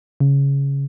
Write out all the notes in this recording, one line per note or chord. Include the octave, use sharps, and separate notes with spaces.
C#3